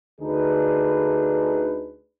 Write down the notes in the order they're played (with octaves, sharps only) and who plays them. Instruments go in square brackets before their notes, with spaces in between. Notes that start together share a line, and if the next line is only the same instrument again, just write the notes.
[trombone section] D2 D3 D4 D#4 G#4 B4